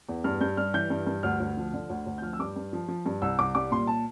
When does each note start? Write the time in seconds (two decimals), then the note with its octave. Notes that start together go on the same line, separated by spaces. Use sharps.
0.09 E2
0.24 G2 F6
0.41 G2 G6
0.57 G3 F6
0.74 E3 G6
0.90 G2
1.07 G2
1.23 D2 F6
1.40 D2
1.57 F3
1.73 D3
1.90 D2
2.06 D2
2.18 G6
2.22 F3 F6
2.33 E6
2.39 G2 D6
2.56 G2
2.73 F3
2.88 F3
3.06 G2
3.22 C2 E6
3.39 C2 D6
3.55 G3 D6
3.71 A#2 C6
3.87 A5